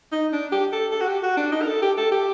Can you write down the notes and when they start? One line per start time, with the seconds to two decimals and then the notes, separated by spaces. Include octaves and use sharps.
0.12 D#4
0.33 D4
0.52 G4
0.72 A4
0.92 A4
1.01 F#4
1.07 G4
1.23 F#4
1.37 D4
1.52 D#4
1.62 A#4
1.67 A4
1.82 G4
1.97 A4
2.12 G4